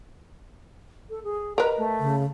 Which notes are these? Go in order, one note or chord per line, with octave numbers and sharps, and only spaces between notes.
A4
G#4
A#4 B4 D#5 A#5
A3
C#3